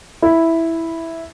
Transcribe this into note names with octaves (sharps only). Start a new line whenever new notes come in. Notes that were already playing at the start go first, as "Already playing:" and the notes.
E4